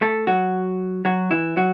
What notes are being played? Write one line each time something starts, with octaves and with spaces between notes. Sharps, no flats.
A3 A4
F#3 F#4
F#3 F#4
E3 E4
F#3 F#4